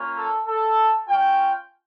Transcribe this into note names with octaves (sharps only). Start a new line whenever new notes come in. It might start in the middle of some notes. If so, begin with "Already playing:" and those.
Already playing: A#3 C#4 F4
A4
A4
C#4 F4 G5